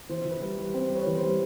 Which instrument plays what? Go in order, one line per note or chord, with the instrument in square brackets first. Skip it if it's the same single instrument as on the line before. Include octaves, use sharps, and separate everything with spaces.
[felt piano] E3 C5
E3
B4
G3
G3
C4 C5
G3
B4 C#5
E3
C5
G3